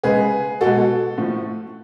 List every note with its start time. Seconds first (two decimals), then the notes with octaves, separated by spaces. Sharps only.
0.03 C#3 G#3 G#4 B4
0.61 B2 G#3 F#4 A4
1.18 A2 F3 A3